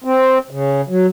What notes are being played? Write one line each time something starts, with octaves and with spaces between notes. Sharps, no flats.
C4
C#3
F#3